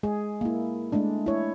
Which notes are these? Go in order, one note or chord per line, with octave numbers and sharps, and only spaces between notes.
G#3 G#4
A#3 E4
G#3 A3 D4
E4 C#5